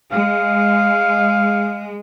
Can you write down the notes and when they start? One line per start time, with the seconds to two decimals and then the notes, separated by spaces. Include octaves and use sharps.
0.12 G#3 F5